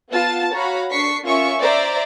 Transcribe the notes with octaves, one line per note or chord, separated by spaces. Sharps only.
B3 F4 A5 A6
F#4 C#5 F5 A#5 B5
D4 C#6 B6 C7
C#4 F4 A#4 E5 C#6
C5 D5 E5 A#5